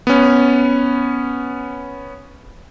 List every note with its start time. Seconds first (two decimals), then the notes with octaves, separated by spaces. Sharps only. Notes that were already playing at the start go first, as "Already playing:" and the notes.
0.07 B3 C#4